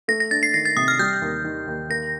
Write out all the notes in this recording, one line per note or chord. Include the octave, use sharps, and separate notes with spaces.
A3 A#6
A#6
D4 A6
C7
D#3 A#6
A6
C3 D#6
F6
G3 G6
D#2
D#3
D#2
A#3 A#6